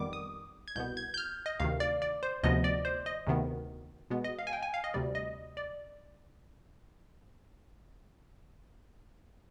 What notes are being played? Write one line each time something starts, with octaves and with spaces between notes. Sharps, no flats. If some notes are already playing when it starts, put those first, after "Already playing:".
Already playing: F2 D#3 G3 B3 D6
D#6
G#6
C2 B2 B3 G6
G#6
G6
F6
D#5
D2 C3 D#3 F5
D5
D5
C5
D2 C3 F3 B3 D#5
D5
C5
D#5
D2 C3 D#3 B3
B2 G#3 B3
D#5
F5
G#5
G5
G#5
F5
D#5
D2 C3 G3 D5
D#5
D5